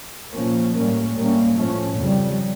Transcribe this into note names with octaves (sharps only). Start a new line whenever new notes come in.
A#2 F3 A#3 C#4
A2 G3 A#3 C#4
A2 G3 A#3 C#4
A2 F3 A3 C#4
F2 C#3 G3